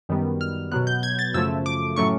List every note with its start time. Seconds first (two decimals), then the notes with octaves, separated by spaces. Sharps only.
0.09 F#2 D#3 G3 B3
0.41 F6
0.72 B2 F#3 B3 F#6
0.87 G6
1.03 G#6
1.19 A6
1.34 F#2 C#3 F3 A3 E6
1.66 D6
1.96 A2 F#3 A3 C#4 C#6